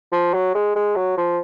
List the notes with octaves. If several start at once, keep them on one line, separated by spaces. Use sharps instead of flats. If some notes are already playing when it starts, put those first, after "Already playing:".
F3
F#3
G#3
G#3
F#3
F3